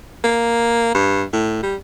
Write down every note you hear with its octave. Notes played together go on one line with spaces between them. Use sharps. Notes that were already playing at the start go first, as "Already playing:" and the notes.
A#3
G2
A2
G3